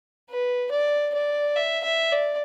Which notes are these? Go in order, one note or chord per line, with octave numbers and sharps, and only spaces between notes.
B4
D5
D5
E5
E5
D5